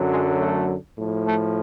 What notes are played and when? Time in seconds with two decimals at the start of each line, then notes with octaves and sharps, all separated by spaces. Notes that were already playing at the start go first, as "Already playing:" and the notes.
Already playing: F#2 D3 F#3
0.09 G#3
0.39 A3
0.97 A2 F3
1.27 A3